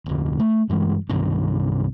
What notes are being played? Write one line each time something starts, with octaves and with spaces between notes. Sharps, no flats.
F1 D2
A3
G2 E3 G#3
C2 G2 C3 D#3